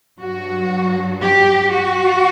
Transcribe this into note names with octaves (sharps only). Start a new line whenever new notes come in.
G2 F#3 F#4
G4
F#4